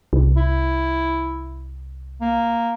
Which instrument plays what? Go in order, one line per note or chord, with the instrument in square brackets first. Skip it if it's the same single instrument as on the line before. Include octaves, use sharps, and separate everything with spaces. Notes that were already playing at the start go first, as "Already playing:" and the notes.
[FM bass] C2
[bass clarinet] E4
A#3